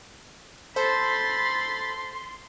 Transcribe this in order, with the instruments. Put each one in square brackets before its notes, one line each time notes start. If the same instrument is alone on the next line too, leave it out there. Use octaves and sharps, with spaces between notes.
[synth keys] A4 C5 [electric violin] B5 A6 [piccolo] C6